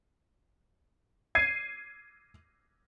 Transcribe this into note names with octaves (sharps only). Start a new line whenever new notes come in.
G#6 C7 D#7